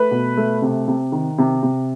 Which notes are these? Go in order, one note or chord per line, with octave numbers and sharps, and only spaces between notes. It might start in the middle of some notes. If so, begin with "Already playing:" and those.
Already playing: A3 B4
B2
A3
C3
C3
D#3
C3
C3